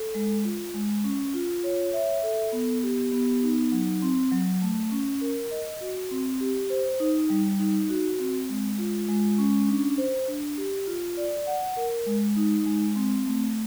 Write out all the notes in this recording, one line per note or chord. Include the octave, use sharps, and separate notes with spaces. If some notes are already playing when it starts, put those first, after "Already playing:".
Already playing: A4
G#3
F4
G#3
C#4
F4
C#5
E5
A4
B3
G4
B3
D#4
F#3
C4
F#3
A3
C#4
A#4
D#5
F#4
C4
G4
C5
D#4
G3
D#4
F#4
C4
G#3
F4
G#3
C#4
D4
C5
D4
G4
F4
D5
F#5
A#4
G#3
D#4
G#3
C4
A3